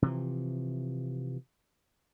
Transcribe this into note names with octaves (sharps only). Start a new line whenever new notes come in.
C3 E3 F3